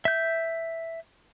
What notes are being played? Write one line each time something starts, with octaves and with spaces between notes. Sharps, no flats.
E5 G6